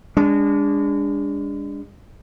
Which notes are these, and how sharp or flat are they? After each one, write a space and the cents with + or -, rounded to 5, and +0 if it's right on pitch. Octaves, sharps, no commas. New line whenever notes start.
G#3 -35 D4 -20